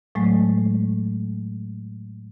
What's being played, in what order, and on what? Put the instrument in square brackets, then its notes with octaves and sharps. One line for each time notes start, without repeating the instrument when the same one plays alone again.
[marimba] A2 F#3 G#3 A3